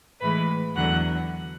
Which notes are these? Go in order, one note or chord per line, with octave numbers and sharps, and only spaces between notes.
A2 E3 G#3 B4 B5
E2 D3 F#3 F#5 F#6